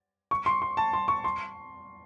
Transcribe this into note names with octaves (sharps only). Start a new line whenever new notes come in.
C#6
C6
C6
A5
C6
C#6
C6